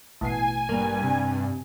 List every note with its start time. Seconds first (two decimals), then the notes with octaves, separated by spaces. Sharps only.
0.21 A1 B2 G#5 C7
0.69 G2 A#3
1.03 C3